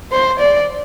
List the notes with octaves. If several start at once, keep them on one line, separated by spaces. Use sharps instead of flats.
C5
D5